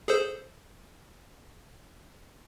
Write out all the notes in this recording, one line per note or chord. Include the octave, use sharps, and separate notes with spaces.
G#4 A4 C5